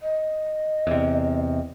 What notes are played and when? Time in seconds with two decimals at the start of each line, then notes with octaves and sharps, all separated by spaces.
0.01 D#5
0.87 E2 C3